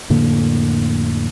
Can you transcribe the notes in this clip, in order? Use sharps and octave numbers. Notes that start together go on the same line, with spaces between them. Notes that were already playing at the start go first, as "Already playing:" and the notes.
F2 A2 D3 A#3